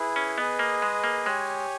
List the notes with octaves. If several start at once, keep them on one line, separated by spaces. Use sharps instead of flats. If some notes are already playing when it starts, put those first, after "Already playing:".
Already playing: E4 G#4 B4
C#4
B3 G#4 B4 D#5
A#3
G#3
A#3
G#3 G4 C#5 G#5